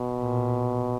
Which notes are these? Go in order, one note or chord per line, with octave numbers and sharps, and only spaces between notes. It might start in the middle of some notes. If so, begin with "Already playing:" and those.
Already playing: B2
A#2